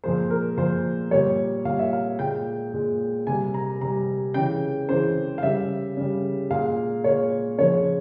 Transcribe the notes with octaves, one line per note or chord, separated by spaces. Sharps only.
A#2 F3 G#3 C5
A#4
A#2 F3 G#3 C5
A#2 G3 C#5
A#2 G3 F5
E5
F5
A#2 G#3 G5
A#2 G#3
C3 G3 G#5
A#5
C3 G3 A#5
C#3 E3 G#3 G5
C#3 E3 G#3 C5
F5
C#3 G3 E5
C#3 G3
A#2 G#3 F5
A#2 G#3 C#5
C#3 F3 G#3 C#5